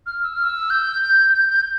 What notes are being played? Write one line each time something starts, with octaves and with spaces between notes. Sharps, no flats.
F6
E6
F6
E6
G6
G6
G6
G6